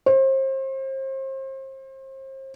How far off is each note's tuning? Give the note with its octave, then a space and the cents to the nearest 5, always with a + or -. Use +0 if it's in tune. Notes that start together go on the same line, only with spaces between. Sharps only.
C5 +35